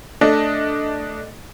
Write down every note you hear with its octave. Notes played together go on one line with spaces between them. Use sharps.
A3 D4 D#5